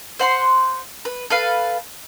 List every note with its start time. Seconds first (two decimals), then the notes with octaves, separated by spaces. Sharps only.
0.19 C5 F#5 C6
1.05 B4
1.30 A4 B4 F5